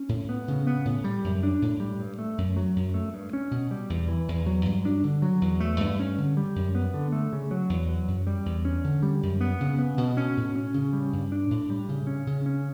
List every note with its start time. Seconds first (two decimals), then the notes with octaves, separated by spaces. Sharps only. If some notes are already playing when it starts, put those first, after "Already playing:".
Already playing: C#4
0.09 A2
0.29 B3
0.48 C#3
0.67 B3
0.85 A2
1.04 G3
1.24 F#2
1.43 D4
1.62 A2
1.80 G3
1.99 G2
2.18 A3
2.38 F#2
2.57 F#3
2.76 F#2
2.94 A3
3.14 G2
3.33 C#4
3.51 B2
3.71 G3
3.90 E2
4.08 E3
4.28 E2
4.46 F#3
4.65 G2
4.85 D4
5.04 D3
5.22 F#3
5.41 E2
5.60 A3
5.80 G2
6.00 C#4
6.18 D3
6.37 G3
6.56 F#2
6.75 B3
6.94 D3
7.12 A3
7.33 C#3
7.51 F#3
7.69 E2
7.89 F#3
8.08 F#2
8.27 G3
8.46 E2
8.65 C#4
8.84 D3
9.03 G3
9.23 F#2
9.41 B3
9.61 C#3
9.79 B3
9.98 B2
10.17 C#4
10.37 A2
10.56 C#4
10.74 C#3
10.93 G3
11.13 G2
11.32 D4
11.51 A2
11.70 G3
11.89 C#3
12.07 C#4
12.27 C#3
12.46 C#4